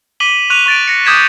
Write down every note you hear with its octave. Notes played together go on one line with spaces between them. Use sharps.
D6 B6 D#7 F#7 G7
C#6 F#6 D#7 F7
C#6 A6 D7
A#6 C#7
D6 D#6 G6 G#6 B6 E7